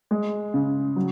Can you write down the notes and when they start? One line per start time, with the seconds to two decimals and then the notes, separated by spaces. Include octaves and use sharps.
0.11 G#3
0.54 C#3
0.96 F#3